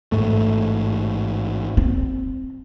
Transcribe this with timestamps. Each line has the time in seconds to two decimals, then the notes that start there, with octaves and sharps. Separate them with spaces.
0.12 A1 G#2 A3
1.77 C4